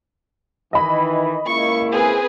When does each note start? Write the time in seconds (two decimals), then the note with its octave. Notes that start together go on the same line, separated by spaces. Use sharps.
0.73 D#3 E3 D#5 B5
1.47 C#2 A#3 E4 C#6
1.92 C4 G#4 B4